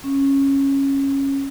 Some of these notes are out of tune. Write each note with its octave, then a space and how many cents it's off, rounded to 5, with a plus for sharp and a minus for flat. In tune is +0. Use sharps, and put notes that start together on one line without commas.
C#4 -15